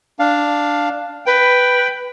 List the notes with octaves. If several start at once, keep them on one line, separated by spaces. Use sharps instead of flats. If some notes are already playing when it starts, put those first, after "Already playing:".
D4 F5
B4 G5